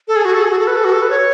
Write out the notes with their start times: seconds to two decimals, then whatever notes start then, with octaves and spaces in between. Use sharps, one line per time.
0.08 A4
0.16 G#4
0.25 F#4
0.33 A4
0.42 G#4
0.50 F#4
0.59 A4
0.67 B4
0.76 A4
0.84 F#4
0.93 A4
1.02 B4
1.10 C#5